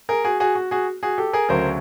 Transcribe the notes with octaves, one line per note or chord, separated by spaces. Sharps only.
G#4 A#4
F#4 G#4
F#4 G#4
F#4
F#4 G#4
F#4 G#4
G4 A4
G#4 A#4
D2 C#3 F#3 A#4 C5